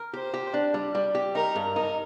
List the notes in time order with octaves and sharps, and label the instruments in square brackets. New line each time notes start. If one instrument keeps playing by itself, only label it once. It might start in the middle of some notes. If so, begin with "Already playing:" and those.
Already playing: [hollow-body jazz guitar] A#4
[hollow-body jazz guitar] G4 [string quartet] C5
[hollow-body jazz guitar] G4
D4
G3
G3
G4
[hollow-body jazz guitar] D#4 [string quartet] A#4
[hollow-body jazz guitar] G2
[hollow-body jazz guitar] D#4 [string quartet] A#4